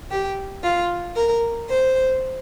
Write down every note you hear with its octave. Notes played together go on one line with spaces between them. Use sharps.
G4
F4
A#4
C5